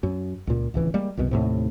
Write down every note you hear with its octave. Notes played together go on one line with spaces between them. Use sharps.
F#2
C#2 A#2
D1 C#2 E3
G3 G#3 A#3
C2 F#2 B2
D#2 A2 C3